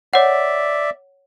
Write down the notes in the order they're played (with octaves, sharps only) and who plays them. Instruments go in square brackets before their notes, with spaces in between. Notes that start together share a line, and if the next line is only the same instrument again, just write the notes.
[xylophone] C#5 F#5 [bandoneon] D5 E5